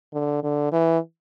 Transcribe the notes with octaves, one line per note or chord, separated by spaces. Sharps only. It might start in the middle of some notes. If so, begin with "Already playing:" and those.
D3
D3
E3